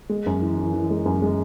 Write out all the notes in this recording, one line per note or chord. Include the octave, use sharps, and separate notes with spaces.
G#3
F#2
E3
E3
E3
G#3
F#2
G#3